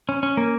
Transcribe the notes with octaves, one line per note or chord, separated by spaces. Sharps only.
C#4
C#4
A#3